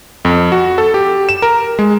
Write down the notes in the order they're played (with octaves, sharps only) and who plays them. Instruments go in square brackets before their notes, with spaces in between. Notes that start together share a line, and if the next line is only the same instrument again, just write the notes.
[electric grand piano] F2
F#4
A4
G4
E7
A#4
G#3